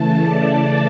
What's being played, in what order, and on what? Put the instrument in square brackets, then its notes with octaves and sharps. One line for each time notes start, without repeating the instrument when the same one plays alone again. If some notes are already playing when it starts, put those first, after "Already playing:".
Already playing: [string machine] C#3 E3 A3 A5
D5